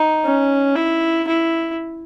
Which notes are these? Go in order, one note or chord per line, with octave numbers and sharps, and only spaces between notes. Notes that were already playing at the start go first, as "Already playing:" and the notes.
Already playing: D#4
C#4
E4
E4